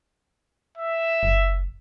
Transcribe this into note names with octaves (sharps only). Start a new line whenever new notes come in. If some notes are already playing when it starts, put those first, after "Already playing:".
E5
F#1